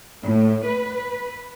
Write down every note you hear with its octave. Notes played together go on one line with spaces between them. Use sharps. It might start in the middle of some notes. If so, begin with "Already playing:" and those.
A2
B4